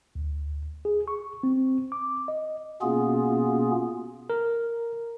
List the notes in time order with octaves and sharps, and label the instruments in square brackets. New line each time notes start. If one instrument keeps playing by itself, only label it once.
[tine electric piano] D2
G#4
C#6
C4
D6
D#5
[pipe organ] B2 A#3 B3 C#4 F4 G#4
[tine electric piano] A#4